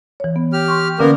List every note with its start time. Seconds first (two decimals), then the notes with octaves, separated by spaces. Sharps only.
0.20 E3 C#5
0.36 B3
0.53 G4 F6
0.68 C6 C#6
0.99 D3 A#3 B3 C#4 A#4 D6